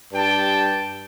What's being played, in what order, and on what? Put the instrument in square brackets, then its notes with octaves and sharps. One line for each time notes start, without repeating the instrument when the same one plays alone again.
[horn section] G2 G4 G5 A5